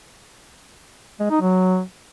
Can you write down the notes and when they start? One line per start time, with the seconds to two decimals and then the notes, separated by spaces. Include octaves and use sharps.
1.20 G#3
1.30 D#4
1.41 F#3